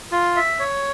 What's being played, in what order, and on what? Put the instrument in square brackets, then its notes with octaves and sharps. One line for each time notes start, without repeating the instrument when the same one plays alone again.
[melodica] F4
E5
C#5